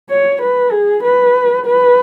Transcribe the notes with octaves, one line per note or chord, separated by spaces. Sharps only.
C#5
B4
G#4
B4
B4